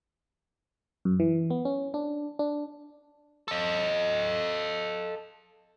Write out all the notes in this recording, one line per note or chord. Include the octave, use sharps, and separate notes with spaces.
F#2
E3
B3
C#4
D4
D4
A4 D#5